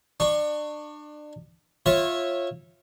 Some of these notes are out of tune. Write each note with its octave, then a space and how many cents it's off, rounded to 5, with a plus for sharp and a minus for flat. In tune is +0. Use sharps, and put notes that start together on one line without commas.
D4 +30 C#6 +0
F4 +0 C#5 -25 E5 -5